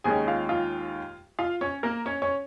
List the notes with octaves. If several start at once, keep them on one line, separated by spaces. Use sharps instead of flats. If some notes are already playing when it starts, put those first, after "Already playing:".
D#2 D#3 G#3 C#4 G#4 G#5
F4 F5
F4 F5
F4 F5
C#4 C#5
A#3 A#4
C#4 C#5
C#4 C#5